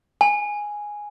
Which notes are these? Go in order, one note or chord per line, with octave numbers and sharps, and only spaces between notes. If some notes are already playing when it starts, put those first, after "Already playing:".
G#5